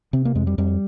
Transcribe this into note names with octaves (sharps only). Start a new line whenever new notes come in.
C3 C4
A#3
F2 G#3
G3
F2 G3